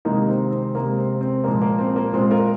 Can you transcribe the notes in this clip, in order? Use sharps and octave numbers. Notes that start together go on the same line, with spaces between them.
C3 D#3 G#3 A#3 D#4
C4
C4
C3 G#3 A#3
C4
C4
A#2 F3 G#3 A#3
A#3
C4
A#3
A#2 G#3 C4
F4 A#4